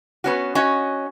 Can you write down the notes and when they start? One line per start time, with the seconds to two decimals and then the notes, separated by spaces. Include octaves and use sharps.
0.24 B3 C#4 F#4
0.55 C#4 F#4 D#5